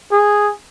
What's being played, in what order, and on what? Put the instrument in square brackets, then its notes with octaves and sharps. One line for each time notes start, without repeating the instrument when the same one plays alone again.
[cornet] G#4